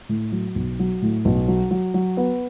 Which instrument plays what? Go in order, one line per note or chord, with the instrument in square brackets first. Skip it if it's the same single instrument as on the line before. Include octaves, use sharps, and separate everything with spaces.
[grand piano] A2
F#3
B1
F#3
A2
B1
F#3
F#3
F#3
B3